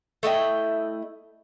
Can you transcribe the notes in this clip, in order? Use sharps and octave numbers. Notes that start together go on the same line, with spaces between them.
A3 E4 D#5 G5